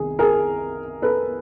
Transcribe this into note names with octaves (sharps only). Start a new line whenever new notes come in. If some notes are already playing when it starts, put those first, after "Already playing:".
Already playing: C2 D#3 G#4
G#4 A#4
A4 B4